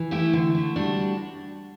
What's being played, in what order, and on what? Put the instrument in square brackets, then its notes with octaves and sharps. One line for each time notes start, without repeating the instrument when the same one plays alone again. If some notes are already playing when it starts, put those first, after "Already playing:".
Already playing: [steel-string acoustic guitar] E3
A3 E4 G4
D3
A3
G3 D4 F#4